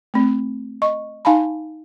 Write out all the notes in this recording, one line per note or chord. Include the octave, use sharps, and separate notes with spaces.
A3 C4
D#5 C#6
D#4 F5 G#5 A5 B5